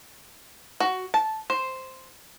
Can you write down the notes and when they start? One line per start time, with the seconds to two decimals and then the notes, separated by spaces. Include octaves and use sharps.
0.80 F#4
1.14 A5
1.50 C5